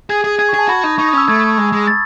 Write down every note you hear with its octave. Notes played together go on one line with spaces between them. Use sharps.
G#4 G#6
G#4
G#4 G#6
C#6
G#4 A5
F#4 B5
D#4
D#4 C#6
D#6
C#4 E6
A3 G#6
G#3
G#3
A6